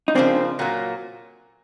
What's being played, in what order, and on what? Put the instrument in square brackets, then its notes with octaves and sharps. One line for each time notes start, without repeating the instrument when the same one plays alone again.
[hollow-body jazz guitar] D#4
[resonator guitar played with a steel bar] C#3 F3 A#3 [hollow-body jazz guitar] C4 D4
[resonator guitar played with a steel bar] A#2 F#3 A#3